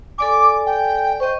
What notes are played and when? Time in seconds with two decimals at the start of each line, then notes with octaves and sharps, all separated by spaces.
0.18 A4 D5 G#5 D6
0.66 G5
1.20 C5 D#5 C#6